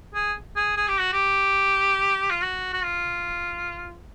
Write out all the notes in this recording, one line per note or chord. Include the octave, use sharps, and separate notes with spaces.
G#4
G#4
G#4
G4
F#4
G4
F4
F#4
F#4
F4